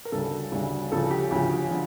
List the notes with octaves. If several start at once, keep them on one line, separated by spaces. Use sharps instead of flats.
A#4
D2 C#3 G3 A4
D2 C#3 G3
D2 C#3 F3 A4
G4
D2 C#3 F3 G4
D3 F3